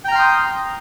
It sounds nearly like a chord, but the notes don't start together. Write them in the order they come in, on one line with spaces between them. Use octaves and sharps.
G5 A#5 F6 C6 D#6